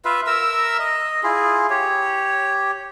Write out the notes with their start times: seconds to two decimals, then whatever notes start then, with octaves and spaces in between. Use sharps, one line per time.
0.05 F4 B4 E5 F5
0.27 A#4 E5 A#5 E6
0.79 D#5
1.23 E4 F4 G#4
1.70 G4 C#5